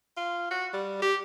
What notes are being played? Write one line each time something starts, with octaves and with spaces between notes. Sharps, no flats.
F4
F#4
G3
G4